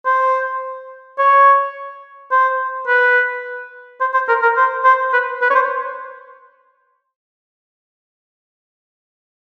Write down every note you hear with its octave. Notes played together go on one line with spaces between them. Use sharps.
C5
C#5
C5
B4
C5
C5
A#4
A#4
C5
C5
B4
B4
C#5
C5